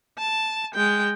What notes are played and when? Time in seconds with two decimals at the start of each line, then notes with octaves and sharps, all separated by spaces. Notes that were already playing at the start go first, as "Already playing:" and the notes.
0.18 A5
0.74 G#3 G5